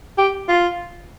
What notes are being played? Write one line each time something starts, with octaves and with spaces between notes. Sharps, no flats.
G4
F4